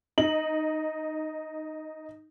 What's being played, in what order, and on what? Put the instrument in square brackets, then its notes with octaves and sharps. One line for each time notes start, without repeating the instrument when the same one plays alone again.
[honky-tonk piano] D#4 F#7